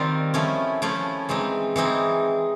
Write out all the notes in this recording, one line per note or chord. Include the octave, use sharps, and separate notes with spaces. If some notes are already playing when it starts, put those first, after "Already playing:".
Already playing: D#3 G3 C4 F4
F3 A3 C#4 E4
F3 A3 C#4 E4
E3 G#3 C4 D#4
E3 G#3 C4 D#4